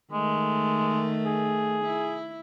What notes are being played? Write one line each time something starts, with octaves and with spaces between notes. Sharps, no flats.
D#3 G#3 A3
G#4
E4